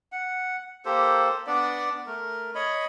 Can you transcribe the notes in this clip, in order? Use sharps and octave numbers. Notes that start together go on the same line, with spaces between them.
F#5
A#3 G4 A4 C5
B3 D4 D5
A3 A#4
C#5 D#5 B5